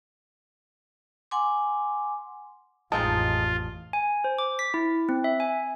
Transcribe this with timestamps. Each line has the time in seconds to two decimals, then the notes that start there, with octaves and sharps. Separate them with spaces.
1.31 F#5 G#5 C6 D6
2.92 A1 F2 G#3 C4 D#4 F4 A5
3.93 G#5
4.24 C5
4.39 D6
4.59 B6
4.74 E4
5.09 C4
5.24 E5
5.40 G#5